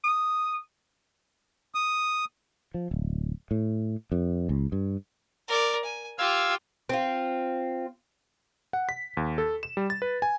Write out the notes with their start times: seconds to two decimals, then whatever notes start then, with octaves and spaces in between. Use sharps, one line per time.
0.04 D#6
1.75 D#6
2.74 F3
2.91 D1
3.51 A2
4.12 F2
4.49 C#2
4.72 G2
5.48 A#4 D5
5.84 G#5
6.18 F4 G4 F5 E6 G#6
6.89 C4 F4
8.73 F#5
8.89 B6
9.17 D#2
9.38 A4
9.63 E7
9.77 G3
9.90 A6
10.02 B4
10.22 G#5